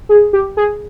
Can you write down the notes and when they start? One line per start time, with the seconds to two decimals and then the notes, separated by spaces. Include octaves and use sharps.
0.09 G#4
0.33 G4
0.57 G#4